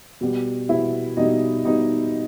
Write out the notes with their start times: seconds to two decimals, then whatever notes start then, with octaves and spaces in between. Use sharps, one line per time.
0.21 B2 G3 B3
0.69 B2 G3 B3 E4 E5
1.17 B2 G3 B3 D#4 D#5
1.65 B2 G3 B3 D#4 D#5